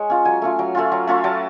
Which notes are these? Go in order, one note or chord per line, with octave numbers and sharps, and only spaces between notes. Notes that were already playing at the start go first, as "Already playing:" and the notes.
Already playing: G#3 C#5
C#4 F4
F#3 G#5
A3 C#4 F4
F#3
A3 C#4 F4
F#3
A3 C#4 F4
F#3 A5